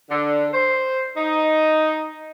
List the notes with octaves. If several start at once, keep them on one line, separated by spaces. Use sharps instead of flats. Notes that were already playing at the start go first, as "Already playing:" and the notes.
D3
C5
D#4